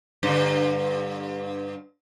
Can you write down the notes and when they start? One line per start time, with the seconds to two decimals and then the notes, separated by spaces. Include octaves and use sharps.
0.23 G2 D3